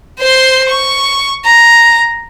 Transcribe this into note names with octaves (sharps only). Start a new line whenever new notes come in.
C5 C6
C#6
A#5